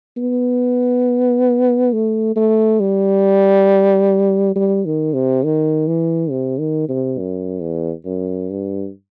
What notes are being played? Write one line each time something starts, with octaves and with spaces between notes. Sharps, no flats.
B3
A3
A3
G3
G3
D#3
C3
D#3
E3
C3
D#3
C3
F#2
E2
F#2
G2